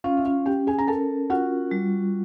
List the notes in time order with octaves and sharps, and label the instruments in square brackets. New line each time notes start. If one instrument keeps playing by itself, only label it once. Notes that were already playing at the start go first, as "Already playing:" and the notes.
[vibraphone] C#4 [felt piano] F4 F5
[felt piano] E5
F4 F5
[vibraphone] C#4 [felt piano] G4 G5
[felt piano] G#4 G#5
A#5
[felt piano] A4 A5 [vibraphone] A#4
[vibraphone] F4 [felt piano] F#4 F#5
[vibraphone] G3